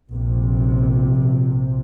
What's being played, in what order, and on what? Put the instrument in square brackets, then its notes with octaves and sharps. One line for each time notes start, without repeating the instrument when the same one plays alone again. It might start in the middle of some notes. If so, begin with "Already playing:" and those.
[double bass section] A#1 C3